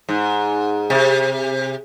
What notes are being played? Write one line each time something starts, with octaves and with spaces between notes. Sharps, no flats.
G#2
C3